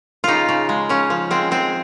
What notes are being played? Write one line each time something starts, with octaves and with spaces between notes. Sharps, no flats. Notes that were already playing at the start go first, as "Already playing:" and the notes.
C#3 D#4 F4
C#3
G#3
C#3 C#4
F3
G#3 C4
G#3 C4